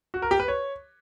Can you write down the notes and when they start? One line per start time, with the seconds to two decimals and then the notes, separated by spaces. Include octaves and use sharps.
0.14 F#4
0.22 A#4
0.31 G4
0.40 B4
0.48 C#5